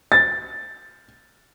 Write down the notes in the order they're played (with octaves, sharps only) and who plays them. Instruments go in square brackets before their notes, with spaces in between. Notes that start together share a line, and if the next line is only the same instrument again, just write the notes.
[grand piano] A6